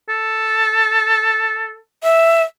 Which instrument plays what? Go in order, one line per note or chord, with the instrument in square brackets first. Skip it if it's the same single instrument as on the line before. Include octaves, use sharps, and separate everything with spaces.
[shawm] A4
[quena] E5